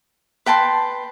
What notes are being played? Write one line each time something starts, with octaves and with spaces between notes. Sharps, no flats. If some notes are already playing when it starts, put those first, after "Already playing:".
B4 G5 A5 C6